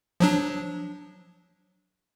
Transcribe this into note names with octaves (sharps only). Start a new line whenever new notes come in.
F3 F#3 D4